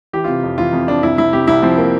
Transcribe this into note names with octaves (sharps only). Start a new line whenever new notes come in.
E3 G4
C3 F4
F2
E3 F4
F2
F2 D4
C2 E4
C3 E4
C3 G4
C2 E4
F3 C4
A#3